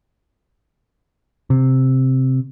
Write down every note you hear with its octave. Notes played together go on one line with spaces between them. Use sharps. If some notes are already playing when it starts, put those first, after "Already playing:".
C3